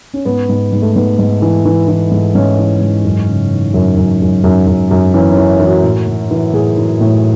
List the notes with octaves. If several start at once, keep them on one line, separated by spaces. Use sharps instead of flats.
C#4
G#2 B3
G#2
G#2
A3
G#2 B3
G#2
E3
E3
E3
G#2
G#2 C#4
E3
G#2
F#2
C#3
E3
F#2
F#2
F#2
F#2
F#2
F#2
E3 C#4
C#4
E3
E3
F#4
A2
A2
E3
A2 G#4
E3
A2